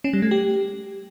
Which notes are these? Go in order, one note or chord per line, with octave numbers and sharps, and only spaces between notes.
C#4
G3
A3
G4